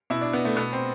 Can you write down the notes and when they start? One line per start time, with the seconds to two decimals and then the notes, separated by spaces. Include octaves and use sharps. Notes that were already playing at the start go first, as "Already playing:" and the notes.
0.10 B2 E4
0.21 D4
0.33 B3
0.45 A3
0.56 B2 B3
0.73 C4